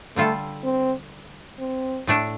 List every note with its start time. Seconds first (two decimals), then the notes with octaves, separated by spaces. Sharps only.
0.16 D3 G3 A3 F4 A4
0.64 C4
1.59 C4
2.07 A2 A3 D4